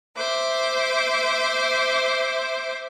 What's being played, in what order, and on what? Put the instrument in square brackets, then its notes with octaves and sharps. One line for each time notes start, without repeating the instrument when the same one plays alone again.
[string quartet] C5 E5 D6